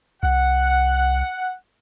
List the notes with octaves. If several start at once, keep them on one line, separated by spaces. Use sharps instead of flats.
C2 F#5